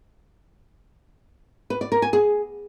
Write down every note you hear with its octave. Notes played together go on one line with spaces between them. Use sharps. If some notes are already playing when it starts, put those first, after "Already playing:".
B4
D5
A#4
G#5
G#4